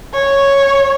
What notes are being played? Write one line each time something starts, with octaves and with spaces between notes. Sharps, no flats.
C#5